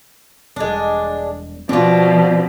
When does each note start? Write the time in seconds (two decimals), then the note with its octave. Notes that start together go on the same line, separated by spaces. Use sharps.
0.56 E1 G3 G#3 D4
1.69 B2 F3 C4 D4 F4